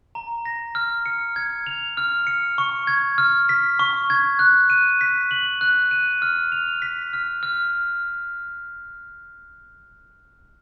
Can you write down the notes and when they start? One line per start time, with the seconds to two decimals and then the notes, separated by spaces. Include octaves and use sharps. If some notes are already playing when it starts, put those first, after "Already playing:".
0.15 A#5
0.45 A#6
0.75 F6
1.06 C#7
1.36 G#6
1.66 F7
1.97 F6
2.27 C#7
2.58 C#6
2.87 G#6
3.18 F6
3.49 B6
3.79 C#6
4.10 G#6
4.39 F#6
4.70 D#7
5.01 B6
5.31 F#7
5.61 F#6
5.91 D#7
6.22 F6
6.52 F7
6.82 B6
7.13 F6
7.43 F6